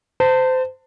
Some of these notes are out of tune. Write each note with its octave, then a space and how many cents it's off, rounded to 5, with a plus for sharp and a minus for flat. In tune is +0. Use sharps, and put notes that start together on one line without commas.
C5 -25 A5 +30